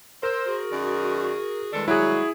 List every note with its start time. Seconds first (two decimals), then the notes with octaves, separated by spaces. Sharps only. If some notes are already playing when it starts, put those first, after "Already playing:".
0.23 A#4 C5 E6
0.46 F#4 G#4
0.72 F#2 D#3 D5
1.73 E2 D#3 G3 G#3 D4 A4
1.88 F#3 E4 G#4